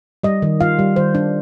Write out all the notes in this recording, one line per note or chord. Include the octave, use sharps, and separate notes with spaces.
G3 D#5
D#3
F4 F5
G3
D#3 C5
D4